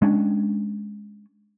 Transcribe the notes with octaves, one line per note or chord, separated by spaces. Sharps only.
G#3 C#4 D4